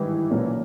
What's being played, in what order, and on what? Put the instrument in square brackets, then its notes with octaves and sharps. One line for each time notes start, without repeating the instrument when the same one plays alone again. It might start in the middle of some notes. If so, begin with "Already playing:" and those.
Already playing: [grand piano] G#1 G2 D#3 [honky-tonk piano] E3
[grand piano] B1 A#2 A#3 C#4